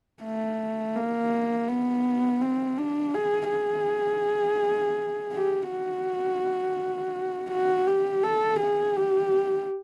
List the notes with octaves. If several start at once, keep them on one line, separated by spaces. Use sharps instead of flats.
A3
A#3
B3
C4
D4
G#4
G#4
G4
F#4
F#4
G4
A4
G#4
G4